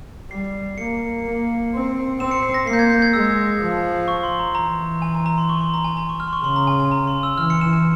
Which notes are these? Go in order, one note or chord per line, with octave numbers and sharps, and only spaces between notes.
G3 C7
A#3 C#7
A#3
C4
C4 E7
C#7
C7
A#6
A#3 C7
G6
G#6
G6
G#6
G#3 E6
F3
C#6
C6
A#5
E3 A#5
G#5
A#5
A#5
C6
C#6
C6
A#5
G#5
A#5
C#6
F6
C6
C#6
C#3 C6
A#5
G#5
G#5
A#5
C6
E6
E3 F6
C#7
E7
E7